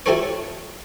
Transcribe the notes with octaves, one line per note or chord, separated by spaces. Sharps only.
E4 F4 G4 A4 C5 C#5